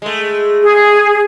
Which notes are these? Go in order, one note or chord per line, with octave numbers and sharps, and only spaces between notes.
G#3 A3
G#4